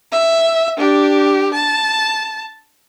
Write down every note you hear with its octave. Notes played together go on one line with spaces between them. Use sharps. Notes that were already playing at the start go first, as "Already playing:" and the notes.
E5
D4 G4
A5